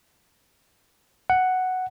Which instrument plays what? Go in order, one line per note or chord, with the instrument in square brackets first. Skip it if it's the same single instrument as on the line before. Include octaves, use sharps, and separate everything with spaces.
[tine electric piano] F#5